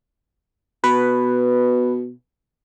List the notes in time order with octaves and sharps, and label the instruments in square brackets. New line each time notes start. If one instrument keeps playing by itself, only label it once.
[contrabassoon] B2 [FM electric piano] B4